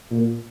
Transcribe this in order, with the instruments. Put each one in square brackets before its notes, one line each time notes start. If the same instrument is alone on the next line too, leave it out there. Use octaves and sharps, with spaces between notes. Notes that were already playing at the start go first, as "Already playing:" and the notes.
[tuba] A#2